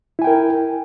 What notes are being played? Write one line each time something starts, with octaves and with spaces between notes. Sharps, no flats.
E4 A#4 G5 G#5